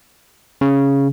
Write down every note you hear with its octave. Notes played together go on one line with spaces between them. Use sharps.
C#3